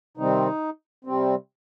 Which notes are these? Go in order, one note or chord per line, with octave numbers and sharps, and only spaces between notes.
C3 D#3 G3 C4 D#4
C3 G3 C4